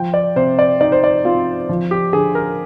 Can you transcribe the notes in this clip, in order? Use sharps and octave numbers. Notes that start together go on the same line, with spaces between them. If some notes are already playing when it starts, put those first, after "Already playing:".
Already playing: F3 G5
D5
C3 C5
D5
D#4 D5
C5
D5
C4 F4
F3
G4
D3 G#4
A#4